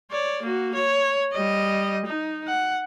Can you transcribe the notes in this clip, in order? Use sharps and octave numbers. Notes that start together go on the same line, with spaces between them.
C#5 D5
A#3 F#4
C#5
G3 D#5
D#4
F#5